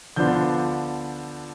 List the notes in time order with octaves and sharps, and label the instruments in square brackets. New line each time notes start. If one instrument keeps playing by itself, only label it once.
[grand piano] D3 F3 B3 D4 F4 G6